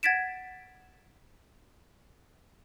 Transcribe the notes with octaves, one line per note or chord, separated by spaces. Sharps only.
F#5 G#6 A6 B6 D7 E7